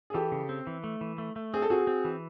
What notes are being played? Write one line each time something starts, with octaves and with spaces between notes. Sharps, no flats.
G#4
E3 G4 A4
C#3
C4
E3
A3
E3
A3
A3
C4 G#4
A4
C4 F#4 G#4
C4
E3